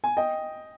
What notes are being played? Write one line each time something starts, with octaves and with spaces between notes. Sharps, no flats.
G#5
D#5 G5